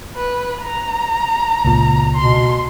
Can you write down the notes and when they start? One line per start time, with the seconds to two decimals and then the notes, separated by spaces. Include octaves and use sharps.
0.16 B4
0.62 A#5
1.65 C#2 A#2
2.15 B2 C6